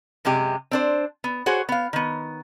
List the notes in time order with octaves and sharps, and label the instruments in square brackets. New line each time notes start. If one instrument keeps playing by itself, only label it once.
[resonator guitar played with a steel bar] F#2 C3 G#3 G4
C4 D4 C5
B3
F#4 G#4 C5 C#5 F#5
B3 F5
D#3 B3